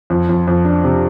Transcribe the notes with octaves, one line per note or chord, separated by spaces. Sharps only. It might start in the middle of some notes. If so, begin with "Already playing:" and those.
F2
F2
F2
D4
C3